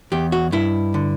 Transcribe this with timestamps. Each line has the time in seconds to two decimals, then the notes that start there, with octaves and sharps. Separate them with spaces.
0.12 E2 G4
0.32 F#4
0.52 G2 E4
0.94 D3